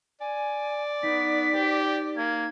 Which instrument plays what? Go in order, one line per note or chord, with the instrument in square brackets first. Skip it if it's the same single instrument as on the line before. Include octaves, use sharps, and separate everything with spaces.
[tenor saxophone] D5 [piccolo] G#5
[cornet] B3 [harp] D#4 [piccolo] B6
[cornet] G4 [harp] C5
[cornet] A#3 [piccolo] G#6